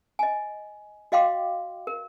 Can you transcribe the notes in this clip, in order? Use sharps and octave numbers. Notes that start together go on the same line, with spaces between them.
D#5 G#5
F#4 D#5 F5 G5 C6 D6
A#4